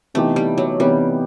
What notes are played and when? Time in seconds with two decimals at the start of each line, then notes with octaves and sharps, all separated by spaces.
0.14 C3 E3 A3 B3 D#4 G4
0.36 G3
0.58 F#3
0.80 C3 E3 G3 B3 D#4 G4